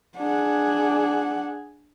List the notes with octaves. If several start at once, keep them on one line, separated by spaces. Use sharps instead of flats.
D4 G#4 F#5